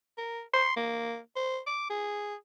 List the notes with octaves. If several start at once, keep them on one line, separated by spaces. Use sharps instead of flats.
A#4
C6
A#3
C5
D6
G#4